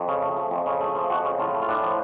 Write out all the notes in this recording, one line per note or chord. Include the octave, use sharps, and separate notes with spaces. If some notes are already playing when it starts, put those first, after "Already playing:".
Already playing: F2 F#4
C#3
A3
F3
F2
C#3
A3 G#4
F3
F2 F#4
C#3
A2 F4
A3
F4
A2 D4
F3